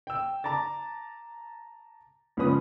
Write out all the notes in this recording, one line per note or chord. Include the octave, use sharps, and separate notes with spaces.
G5 E6
A5 A#5 D6 A6
C#2 F3 C#4 B4 D#6